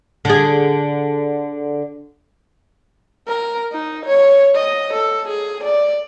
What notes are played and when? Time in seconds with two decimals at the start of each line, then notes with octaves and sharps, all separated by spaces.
0.25 D3 G#4
3.28 A#4
3.72 D#4
4.06 C#5
4.56 D#5
4.93 A4
5.28 G#4
5.64 D5